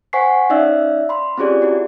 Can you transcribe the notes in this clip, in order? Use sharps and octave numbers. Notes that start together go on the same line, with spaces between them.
C5 F#5 G#5 C#6 B6 C7
C#4 D#4 D5 E5 F5 E6
B5 C6
C4 C#4 F4 G4 G#4 D5
E4 F#4